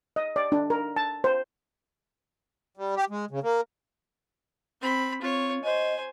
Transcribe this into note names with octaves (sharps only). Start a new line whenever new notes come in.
D#5
D5
D4
A#4
A5
C5
G3
G4
G#3
C#3
A#3
C4 B5
C4 F4 C#5
C5 D#5 G#5